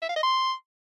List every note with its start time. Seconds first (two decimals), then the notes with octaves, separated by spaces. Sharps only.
0.02 E5
0.09 F5
0.16 D#5
0.23 C6